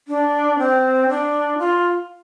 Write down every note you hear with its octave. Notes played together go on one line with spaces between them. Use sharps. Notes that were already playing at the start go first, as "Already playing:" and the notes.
D4
C4
D4
F4